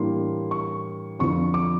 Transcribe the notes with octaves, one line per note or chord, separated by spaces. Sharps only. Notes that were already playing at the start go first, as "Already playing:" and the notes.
Already playing: A2 E3 G3 A#3 D4 C6
C#6
F2 D3 F3 C#6
D6